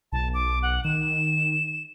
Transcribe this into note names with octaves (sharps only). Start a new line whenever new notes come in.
B1 A5
D6
F#5
D#3 E7